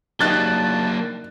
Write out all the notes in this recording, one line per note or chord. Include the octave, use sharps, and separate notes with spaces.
F#3 A#3 D4 D#4 G4 A5 F#6 A6